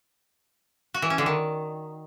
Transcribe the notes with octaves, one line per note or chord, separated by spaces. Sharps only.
F#4
E3
C#4
D3
D#3